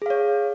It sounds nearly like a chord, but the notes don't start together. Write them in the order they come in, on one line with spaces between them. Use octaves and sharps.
G#4 F5 C#5